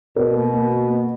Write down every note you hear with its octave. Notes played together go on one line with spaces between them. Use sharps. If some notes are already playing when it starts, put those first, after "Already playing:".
B2 A#4
A#3
A#3
A#3
A#3